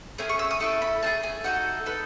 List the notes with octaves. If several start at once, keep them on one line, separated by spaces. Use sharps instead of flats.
A3 C#4 G#4 G#5
C#6
E6
D#6
A3 E4 A4 C#6
B5
A3 D#4 G#4 A5
G#5
D#4 F#4 A4 F#5
D#4 A4 B4